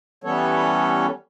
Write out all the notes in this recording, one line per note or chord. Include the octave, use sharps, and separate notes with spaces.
E3 G3 B3 C#4 A4 C#5